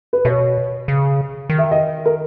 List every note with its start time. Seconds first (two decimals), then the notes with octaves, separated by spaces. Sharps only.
0.13 B4
0.25 B2 C#5
0.88 C#3
1.49 D#3
1.58 E5
1.71 D#5
2.06 A#4